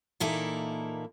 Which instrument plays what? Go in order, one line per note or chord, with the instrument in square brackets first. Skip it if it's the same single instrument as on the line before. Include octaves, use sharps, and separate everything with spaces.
[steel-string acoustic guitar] A#2 E3 A#3 D#4 E4 A4